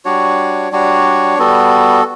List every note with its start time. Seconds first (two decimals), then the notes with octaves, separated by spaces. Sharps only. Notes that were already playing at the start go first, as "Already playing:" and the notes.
0.05 G3 D4 F#4 C#5
0.72 G3 D4 F#4 C#5
1.38 G3 B3 F#4 A4